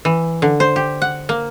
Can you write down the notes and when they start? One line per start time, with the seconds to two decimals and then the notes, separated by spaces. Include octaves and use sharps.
0.05 E3
0.42 D3
0.60 C5
0.76 G4
1.02 F#5
1.29 A#3